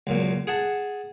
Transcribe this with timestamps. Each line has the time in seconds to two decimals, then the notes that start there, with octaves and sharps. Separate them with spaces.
0.07 C#2 F#2 A#2
0.47 G#4 F#5 A5